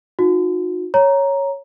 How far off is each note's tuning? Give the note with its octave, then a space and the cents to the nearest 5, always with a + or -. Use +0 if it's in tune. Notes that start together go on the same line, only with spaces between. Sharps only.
D#4 +0 F#4 -40
C#5 +0 A#5 +5